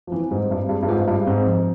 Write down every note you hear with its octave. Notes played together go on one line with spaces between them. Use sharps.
F3
E3 C4
G#2 G3
G2 G3
G2 G#4
G2
G#2 F4
G2 G#4
G#2 C4
F3